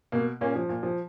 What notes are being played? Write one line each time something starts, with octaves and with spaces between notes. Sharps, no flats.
B2 A#3
A#2 A#3 C#4
F3
A#2
F3